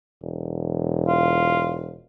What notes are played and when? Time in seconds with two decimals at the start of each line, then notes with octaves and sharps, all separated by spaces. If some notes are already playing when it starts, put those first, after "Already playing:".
0.22 E1
1.08 F4